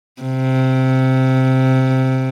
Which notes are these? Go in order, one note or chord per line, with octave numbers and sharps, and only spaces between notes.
C3